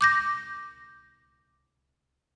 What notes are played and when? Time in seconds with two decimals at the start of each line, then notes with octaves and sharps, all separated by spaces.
0.01 D6 G6 A#6